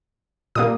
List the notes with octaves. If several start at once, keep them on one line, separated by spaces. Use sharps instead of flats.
A#2 G3 A#3 D#6